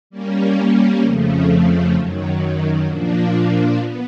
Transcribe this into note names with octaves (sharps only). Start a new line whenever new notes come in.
G3 A#3 C#4
F2 C#3 F3 A3
F#2 D#3 F#3
A#2 F3 A#3 D4
B3